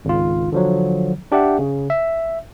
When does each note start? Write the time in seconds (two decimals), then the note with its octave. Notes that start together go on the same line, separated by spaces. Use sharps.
0.05 G#1 C#2 F4
0.52 D3 F3 F#3
1.32 D4 G4 D5 E5 F#5
1.59 C#3
1.90 E5